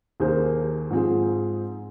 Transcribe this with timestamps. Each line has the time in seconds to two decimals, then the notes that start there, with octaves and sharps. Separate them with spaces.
0.20 D#2 D#3 A#3 G#4 C5
0.90 G#2 F3 C4 F4 G#4